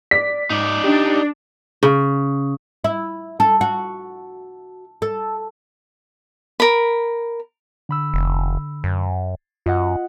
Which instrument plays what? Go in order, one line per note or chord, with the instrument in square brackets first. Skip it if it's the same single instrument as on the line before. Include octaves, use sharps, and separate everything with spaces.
[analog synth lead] D5 [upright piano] B6
[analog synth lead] G#2 [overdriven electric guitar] D#4 D5
[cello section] D4 [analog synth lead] G4
[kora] C#3
[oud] E4
A4
F#4
A4
[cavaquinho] A#4 B5
[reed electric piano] D3 B5 E6
[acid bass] F1
F#2
[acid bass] F#2 [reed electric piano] F4 D#5 F#5